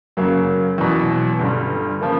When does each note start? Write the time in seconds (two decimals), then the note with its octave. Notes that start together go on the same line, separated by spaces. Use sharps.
0.17 F#2 C#3 F#3 A#3
0.78 E2 B2 F#3
1.39 G1 G2 D3 G3
2.01 C#3 F3 A#3